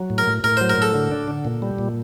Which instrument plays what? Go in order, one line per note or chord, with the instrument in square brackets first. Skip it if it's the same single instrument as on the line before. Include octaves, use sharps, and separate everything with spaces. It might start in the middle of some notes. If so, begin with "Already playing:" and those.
Already playing: [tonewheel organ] F#3
A2
[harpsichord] A#4
[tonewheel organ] A2
[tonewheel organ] A2 [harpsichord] A#4
[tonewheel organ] F#3 [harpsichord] C5
[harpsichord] A#4
[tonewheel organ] A2 [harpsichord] A4
[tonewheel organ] D3
D4
D3
A#2
G3
A#2